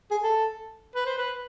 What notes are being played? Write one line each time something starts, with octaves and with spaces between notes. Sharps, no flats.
G#4
A4
B4
C5
B4